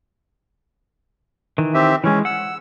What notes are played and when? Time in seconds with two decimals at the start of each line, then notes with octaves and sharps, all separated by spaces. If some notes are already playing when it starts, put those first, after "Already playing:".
1.58 D#3 E3
1.74 C4 G4 E5
2.04 E3 G#3 C#4
2.25 F#5 E6